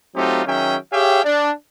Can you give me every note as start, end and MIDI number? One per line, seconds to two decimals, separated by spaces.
0.16 0.43 54
0.16 0.43 57
0.16 0.43 60
0.16 0.43 63
0.16 0.43 65
0.16 0.43 67
0.46 0.77 51
0.46 0.77 54
0.46 0.77 61
0.46 0.77 68
0.46 0.77 76
0.46 0.77 79
0.93 1.23 67
0.93 1.23 68
0.93 1.23 73
0.93 1.23 76
0.93 1.23 77
0.93 1.23 79
1.24 1.51 62